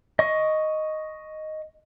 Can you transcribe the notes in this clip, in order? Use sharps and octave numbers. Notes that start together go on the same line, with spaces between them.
D#5 C#6